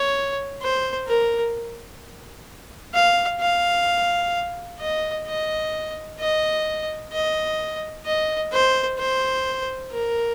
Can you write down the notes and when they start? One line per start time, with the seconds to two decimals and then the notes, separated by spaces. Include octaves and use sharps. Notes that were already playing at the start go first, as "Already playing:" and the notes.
Already playing: C#5
0.62 C5
1.07 A#4
2.94 F5
3.40 F5
4.79 D#5
5.27 D#5
6.19 D#5
7.12 D#5
8.05 D#5
8.52 C5
8.99 C5
9.91 A#4